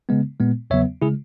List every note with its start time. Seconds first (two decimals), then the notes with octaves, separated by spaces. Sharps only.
0.09 C#3 G#3 B3
0.40 A#2 G#3 B3
0.70 E2 C#3 F#3 B3 C#5 E5
1.02 C#3 G#3 E4 G#4